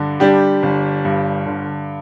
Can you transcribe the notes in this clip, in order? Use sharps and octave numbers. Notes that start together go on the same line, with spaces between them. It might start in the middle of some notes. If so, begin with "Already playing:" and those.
Already playing: G2 D3
G3 D4 G4
G1
G2
D3